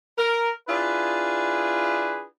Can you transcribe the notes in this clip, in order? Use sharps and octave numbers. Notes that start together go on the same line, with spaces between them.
A#4
D4 E4 F4 G#4 B4